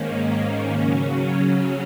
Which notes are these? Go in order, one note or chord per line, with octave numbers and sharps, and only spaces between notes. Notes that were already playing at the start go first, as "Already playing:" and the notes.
Already playing: G#2 D#3 A#3 C#4
C#3 F#3 C#4